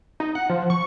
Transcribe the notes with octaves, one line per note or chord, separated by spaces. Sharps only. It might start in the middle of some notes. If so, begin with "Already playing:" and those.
D#4
F#5
F3
C#6